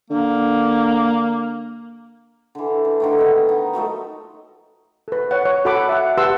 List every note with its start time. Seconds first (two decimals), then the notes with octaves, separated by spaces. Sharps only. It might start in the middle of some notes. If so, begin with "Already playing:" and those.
0.10 D3 A#3
2.55 D3 E3
2.85 D4
3.00 D3 D#3 A3
3.18 B3 D#5
3.49 D#4
3.73 F3 F#3 A3 D#4
5.08 A4 B4
5.31 C#5 F#5
5.45 C#5
5.65 F#4 A4 C#5 F#5 B5 D6
5.89 E5 F#5
6.18 G4 B4 F#5 A5 C6 E6